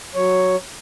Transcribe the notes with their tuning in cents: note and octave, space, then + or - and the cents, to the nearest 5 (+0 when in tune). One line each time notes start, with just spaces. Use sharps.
F#3 +0 C#5 +0